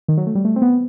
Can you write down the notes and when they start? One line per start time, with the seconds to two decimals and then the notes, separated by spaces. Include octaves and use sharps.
0.08 D#3
0.17 F#3
0.27 A3
0.35 G3
0.45 A3
0.56 C4
0.62 B3